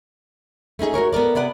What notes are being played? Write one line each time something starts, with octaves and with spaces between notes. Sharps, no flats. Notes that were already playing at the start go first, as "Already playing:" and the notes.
A3 C#4 D#4 G#4
F#4 G4 A#4 C#5
B3 A4 A#4 D5
C3 B3 D5 F#5